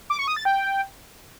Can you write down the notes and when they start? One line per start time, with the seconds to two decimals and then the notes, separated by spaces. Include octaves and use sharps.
0.10 D6
0.19 C#6
0.28 D#6
0.36 A6
0.45 G5